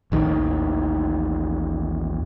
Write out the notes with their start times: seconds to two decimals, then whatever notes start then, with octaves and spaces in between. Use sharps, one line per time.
0.12 A1 D#2 D#3